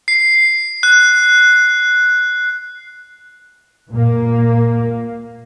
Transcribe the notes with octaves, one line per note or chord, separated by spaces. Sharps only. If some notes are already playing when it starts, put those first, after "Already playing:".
C7
F#6
A#2 A#3